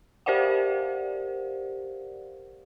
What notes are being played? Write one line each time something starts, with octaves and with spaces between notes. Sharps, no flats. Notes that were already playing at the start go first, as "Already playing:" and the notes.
G4 A#4 C5 D5 F5 F#5